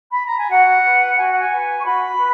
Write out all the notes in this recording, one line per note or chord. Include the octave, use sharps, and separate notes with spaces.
B5
A#5
G#5
F#4 F#5
B4
F#4 G#5
F#5
G#5
B4
C#6
F#4 B5
B4